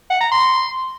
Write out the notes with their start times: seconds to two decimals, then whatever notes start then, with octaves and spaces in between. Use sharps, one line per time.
0.10 F#5
0.21 A#5
0.31 C6